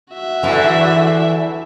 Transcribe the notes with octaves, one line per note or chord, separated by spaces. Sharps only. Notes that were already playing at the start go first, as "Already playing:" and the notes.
F#4 E5
E2 D3 E3 E4